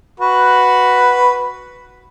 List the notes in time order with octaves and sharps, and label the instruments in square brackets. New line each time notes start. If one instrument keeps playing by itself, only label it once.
[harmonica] F#4 B4